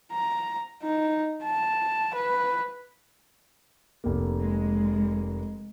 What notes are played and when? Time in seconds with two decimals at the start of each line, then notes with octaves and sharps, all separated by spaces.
0.12 A#5
0.82 D#4
1.44 A5
2.15 B4
4.04 F1 A#3
4.40 G#3